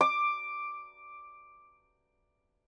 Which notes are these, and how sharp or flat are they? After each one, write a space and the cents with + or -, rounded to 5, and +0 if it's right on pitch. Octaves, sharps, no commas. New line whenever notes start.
D6 +5